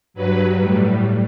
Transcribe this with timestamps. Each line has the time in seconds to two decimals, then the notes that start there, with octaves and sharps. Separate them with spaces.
0.14 G2 F#3 B4
0.57 A2 G3